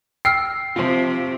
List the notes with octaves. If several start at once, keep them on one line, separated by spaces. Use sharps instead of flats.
G5 E6 F6 C7
C3 F4 C5